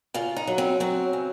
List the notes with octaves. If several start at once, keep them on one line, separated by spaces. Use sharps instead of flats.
C#3 F4
D#4
F#3
C4
F#3 C4
C#3